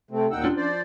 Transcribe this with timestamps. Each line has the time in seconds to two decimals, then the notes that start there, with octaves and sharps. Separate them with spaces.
0.11 C3 A3 C4
0.31 D#2 A#2 D#4 F#5 G5 E6
0.44 C#4 D4 F4
0.57 F3 C5 D5